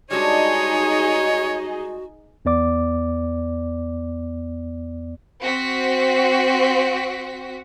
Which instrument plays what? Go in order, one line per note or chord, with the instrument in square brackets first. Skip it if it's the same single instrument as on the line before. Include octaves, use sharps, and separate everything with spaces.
[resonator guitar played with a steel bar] G3 G#3 D4 [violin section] D#4 G#4 D#5 [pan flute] F#4 [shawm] C#5
[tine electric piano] E2 B3 D5 D6
[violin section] C4 F#4 B6